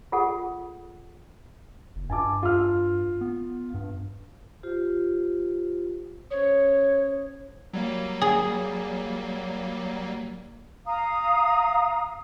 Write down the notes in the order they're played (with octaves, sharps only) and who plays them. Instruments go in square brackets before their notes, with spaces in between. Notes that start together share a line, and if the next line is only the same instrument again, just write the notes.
[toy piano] F4 G#4 A4 F#5
[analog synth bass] F#1
[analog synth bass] G2 [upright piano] G#5 A5 D6
[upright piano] F4 F6
[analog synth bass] B3
G2
[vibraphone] F4 G4 C5
[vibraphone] C#4 C5 D#6 [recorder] C#5
[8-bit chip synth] F#3 G3 A#3
[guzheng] G#4
[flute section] F5 A#5 D#6